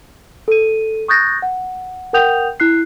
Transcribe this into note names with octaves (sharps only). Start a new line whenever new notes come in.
A4 D#7
C#6 D#6 F#6 G6 A6 A#6
F#5
A#4 F#5 G5 D#6 G6 F7
E4 F#6 C7